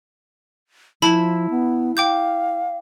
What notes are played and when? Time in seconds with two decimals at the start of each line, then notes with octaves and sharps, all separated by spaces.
1.02 F3 E4 A5 B5
1.50 B3
1.97 F5 G5 D6 G6